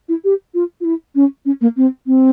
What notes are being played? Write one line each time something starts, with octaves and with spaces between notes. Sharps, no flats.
E4
G4
F4
F4
E4
C#4
C#4
A#3
C4
C4